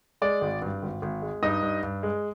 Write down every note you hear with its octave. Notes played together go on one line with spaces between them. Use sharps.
G#3 D5
G#1
G2
G#1
G#1
G#3
G2 D#4 D#5
G2
G2
G#3